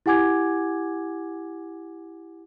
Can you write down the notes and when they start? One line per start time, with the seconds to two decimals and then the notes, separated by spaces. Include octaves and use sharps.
0.06 E4 G4 F#5 G#5 D6 G#6